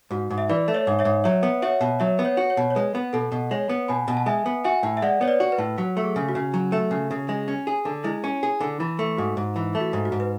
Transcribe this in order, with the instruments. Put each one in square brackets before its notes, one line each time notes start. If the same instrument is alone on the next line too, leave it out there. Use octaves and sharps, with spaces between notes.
[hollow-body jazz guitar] G#2 [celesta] F#4
[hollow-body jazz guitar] G#2
[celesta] E5
[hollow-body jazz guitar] E3 [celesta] B4 D5
[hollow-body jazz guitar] A3
[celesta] C#5 E5
[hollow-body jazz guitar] G#2
[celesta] C#5 E5
[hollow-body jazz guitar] G#2
[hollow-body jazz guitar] F#3 [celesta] C#5 E5
[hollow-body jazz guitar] B3
[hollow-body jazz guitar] F#4 [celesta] C#5 E5
[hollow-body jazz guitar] B2
[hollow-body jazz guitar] F#3 [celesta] C#5 E5
[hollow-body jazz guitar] B3
[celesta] C#5
[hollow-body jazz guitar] F#4
[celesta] C#5
[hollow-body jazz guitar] B2
[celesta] C#5
[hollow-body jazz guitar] G#3 [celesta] B4
[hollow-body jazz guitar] B3
[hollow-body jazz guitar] B2 [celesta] A4
[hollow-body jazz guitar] B2
[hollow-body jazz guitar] G#3 [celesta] C#5
[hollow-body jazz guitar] B3
[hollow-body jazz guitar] B2 [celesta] G#5 B5
[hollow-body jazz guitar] B2
[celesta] A5
[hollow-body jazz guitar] G#3 [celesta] E5 G#5
[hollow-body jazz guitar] B3
[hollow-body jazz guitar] F#4 [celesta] E5 G#5
[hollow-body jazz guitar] A2
[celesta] E5
[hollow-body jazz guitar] G#3 [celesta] D5 F#5
[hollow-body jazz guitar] B3 [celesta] C#5
[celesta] B4 D5
[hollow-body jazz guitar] F#4
[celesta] B4
[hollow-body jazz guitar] A2
[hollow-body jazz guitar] F#3 [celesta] F#4
[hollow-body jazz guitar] A3
[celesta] G#4
[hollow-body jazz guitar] C#3
[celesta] F#4
[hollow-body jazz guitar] C#3
F#3
A3
C#3
C#3
G#3
C#4
G#4
D3
[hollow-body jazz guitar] G#3 [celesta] E4
[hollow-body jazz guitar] C#4
G#4
D3
[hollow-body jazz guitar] E3 [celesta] E4
[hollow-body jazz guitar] A3
[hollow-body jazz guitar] G#2 [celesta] F#4
[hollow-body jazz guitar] G#2
E3
A3
[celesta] F#4
[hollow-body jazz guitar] G#2
[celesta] F#4
[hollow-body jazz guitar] G#2
[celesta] B4